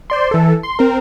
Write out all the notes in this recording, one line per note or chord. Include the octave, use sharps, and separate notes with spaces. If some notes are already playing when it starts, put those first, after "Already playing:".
C5 D5 C6
E3 A4
C6
C4 A#4